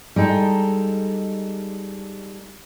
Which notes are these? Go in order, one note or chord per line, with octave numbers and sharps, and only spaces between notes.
G3 G#3 D#4 A4